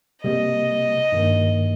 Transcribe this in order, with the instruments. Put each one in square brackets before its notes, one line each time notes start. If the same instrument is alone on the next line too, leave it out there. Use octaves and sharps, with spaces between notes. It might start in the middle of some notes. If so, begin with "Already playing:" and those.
[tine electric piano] C3 G3 A#3 [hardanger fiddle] D#5
[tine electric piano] G2 D#3 A#3